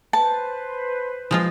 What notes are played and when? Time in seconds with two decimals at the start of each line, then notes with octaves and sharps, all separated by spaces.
0.13 B4 C5 A5
1.31 F3 G#3 F4